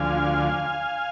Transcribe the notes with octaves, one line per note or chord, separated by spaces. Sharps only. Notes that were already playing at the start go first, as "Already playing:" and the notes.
Already playing: D2 D3 F3 F5 G#5